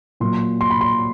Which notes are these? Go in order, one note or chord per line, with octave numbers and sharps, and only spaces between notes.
A#2 F#3 C6
C6
B5
C6